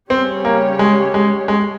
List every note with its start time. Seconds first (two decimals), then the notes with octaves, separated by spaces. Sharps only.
0.10 C#3 G3 C4 C#4 G4 C#5
0.45 A#3
0.79 G#3
1.14 G#3
1.48 G#3